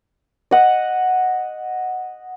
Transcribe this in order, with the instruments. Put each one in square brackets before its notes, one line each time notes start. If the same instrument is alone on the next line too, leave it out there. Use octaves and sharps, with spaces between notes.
[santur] D#5 F#5